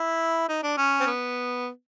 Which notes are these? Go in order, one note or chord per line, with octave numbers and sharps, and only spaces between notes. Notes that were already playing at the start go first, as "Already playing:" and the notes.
Already playing: E4
D#4
D4
C#4
C4
B3